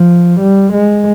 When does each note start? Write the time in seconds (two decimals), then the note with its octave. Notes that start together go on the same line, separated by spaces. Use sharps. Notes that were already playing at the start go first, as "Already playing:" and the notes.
Already playing: F3
0.41 G3
0.74 G#3